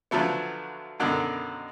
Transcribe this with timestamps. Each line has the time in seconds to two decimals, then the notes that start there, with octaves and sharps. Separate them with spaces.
0.11 D3 F3 F#3 A3 B3
1.00 F#2 B2 D3 D#3